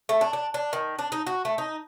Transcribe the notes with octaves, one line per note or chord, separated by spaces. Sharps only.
A3
D4
D4
D4
D#3
D4
D#4
F#4
A3
D#4